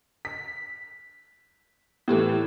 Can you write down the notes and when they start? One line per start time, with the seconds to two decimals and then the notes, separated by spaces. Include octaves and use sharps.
0.25 B6
2.08 A2 E3 E4 G4 A4